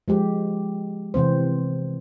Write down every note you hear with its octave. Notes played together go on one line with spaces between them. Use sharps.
F3 G#3 G4
C3 E3 C4 C5